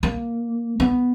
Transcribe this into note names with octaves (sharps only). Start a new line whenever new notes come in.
A#3
B3